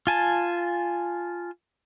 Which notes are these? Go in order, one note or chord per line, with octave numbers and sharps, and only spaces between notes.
F4 G#5 A5